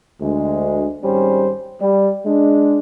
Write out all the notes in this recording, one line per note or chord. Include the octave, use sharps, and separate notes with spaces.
D2 G#3
G#1 G3 C#4 C5
G3
G#3 D4